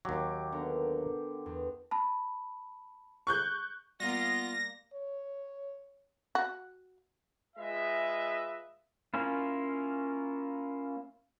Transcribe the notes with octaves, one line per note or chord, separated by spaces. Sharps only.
D#2 F#3 G4 D6
D3 B3 A#4
E2
A5 B5
C#6 F#6 G6
G3 A#3 B3 F4 A#6
C#5
F#4
G#3 F4 B4 D#5 E5
A#3 C#4 E4 F4